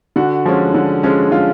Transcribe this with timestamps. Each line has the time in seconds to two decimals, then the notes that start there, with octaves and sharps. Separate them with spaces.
0.16 D3 F#4
0.45 F3 G#3 C#4
0.74 D3
1.03 F3 G#3 C#4
1.31 D3 F4